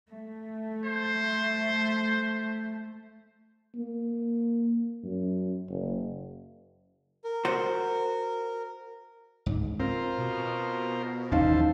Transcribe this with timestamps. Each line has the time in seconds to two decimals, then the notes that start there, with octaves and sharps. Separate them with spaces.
0.11 A3
0.85 C5
3.75 A#3
5.04 F#2
5.69 F#1
7.24 A#4
7.45 F#4 C5
9.46 C#2 G#2
9.80 C4 F4 A#4 C5
10.18 B2
11.32 F#1 D#2 E3 C#4 D#4 C5 F5 A5